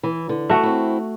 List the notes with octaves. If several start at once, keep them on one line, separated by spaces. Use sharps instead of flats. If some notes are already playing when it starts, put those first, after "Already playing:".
E3
D3
A3 F#4
C4 E4